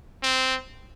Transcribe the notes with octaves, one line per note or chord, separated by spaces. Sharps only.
C4